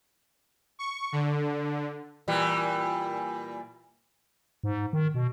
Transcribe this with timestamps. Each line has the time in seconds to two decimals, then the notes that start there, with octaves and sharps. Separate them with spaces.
0.79 C#6
1.12 D3
2.28 A#2 E3 G3
4.64 G#2
4.93 D#3
5.14 B2